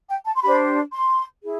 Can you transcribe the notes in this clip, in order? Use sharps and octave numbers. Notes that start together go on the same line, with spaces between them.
G5
A5
C6
D4 G4 C5 B5
C6
E4 G#4